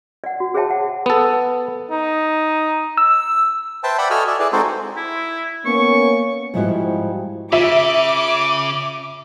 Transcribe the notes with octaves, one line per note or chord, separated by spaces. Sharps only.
D5 F#5
F#4
G#4 C5 C#5 E5 G5 A5
F#5
B3 A4
D#4
E6
B4 C5 E5 G5 A5
D5 E5 F#5 G5 B5
F#4 A4 D#5 G#5 E6 F6
D5 E5
E4 G#4 B4 D5
G#3 C4 D#4 F#4 A4 C5
E4
A#3 B3 C#4 C#6
G#2 F3 G3 E4 F#4 C5
C#3 F4 E5 D6